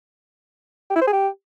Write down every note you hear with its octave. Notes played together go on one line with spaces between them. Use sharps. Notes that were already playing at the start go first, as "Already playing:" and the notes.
G4
E4
C5
G#4
G4